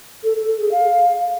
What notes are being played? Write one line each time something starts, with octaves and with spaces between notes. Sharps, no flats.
A4
A4
A4
G#4
F5